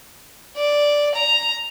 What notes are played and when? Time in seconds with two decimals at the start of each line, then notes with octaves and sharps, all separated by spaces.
0.57 D5
1.15 A#5